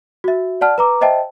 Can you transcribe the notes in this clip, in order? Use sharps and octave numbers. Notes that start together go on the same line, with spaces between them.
F#4 E5
D5 F#5 A5 F6
B4 A#5 D6
C5 D#5 E5 G5 A5